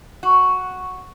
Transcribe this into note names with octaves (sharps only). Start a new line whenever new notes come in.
F#4